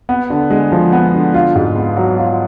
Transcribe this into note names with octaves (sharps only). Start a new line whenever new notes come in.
B3
D3
G#3
F3
B3
D3
F4
G#2
B3
F#3
F4